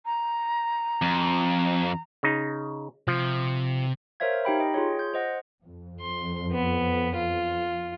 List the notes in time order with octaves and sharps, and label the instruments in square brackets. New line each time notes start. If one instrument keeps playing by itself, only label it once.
[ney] A#5
[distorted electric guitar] F2
[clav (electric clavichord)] C#3 D#4
[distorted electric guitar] C3 [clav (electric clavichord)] F3
[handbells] A#4 C5 C#5 E5 F5 G#6
D#4 G4 G5 B5
D#5 G5
F4 G#4 C#5
G6
C5 D#5 F#5
[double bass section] F2
[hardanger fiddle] C6
B3
F4